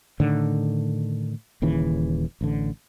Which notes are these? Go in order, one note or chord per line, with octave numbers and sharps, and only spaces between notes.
A2 D3 D#3
D#1 D#2 C#3 E3
A1 D3